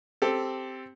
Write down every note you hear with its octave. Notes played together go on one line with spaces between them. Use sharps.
C4 G4 A4